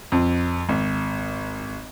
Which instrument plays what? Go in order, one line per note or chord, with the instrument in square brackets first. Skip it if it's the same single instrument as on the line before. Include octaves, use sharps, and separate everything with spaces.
[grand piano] F2
G#1